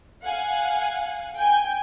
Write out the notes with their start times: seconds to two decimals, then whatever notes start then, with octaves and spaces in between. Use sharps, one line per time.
0.24 F5 F#5 G#5
1.35 G5 G#5 G6